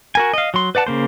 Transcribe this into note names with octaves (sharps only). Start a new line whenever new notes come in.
F#4 A#4 G#5
D#5 F5
F#3 C6
B4 D5 F#5 A5
C#3 A#3 C5